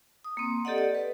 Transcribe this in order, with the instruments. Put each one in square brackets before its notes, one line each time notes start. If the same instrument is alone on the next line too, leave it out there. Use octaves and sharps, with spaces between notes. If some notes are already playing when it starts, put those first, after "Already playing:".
[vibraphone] D#6
A#3 C4
G4 A4 D5 D#5 F#5
D5
B4